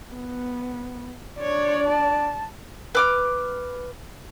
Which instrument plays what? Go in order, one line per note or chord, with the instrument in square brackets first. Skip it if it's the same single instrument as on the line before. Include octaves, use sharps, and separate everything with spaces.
[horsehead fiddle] B3
[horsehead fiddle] D4 D5 [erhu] C#5
[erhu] A5
[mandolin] B4 D6 F6